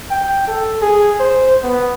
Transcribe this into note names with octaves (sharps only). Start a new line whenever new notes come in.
G5
A4
G#4
C5
B3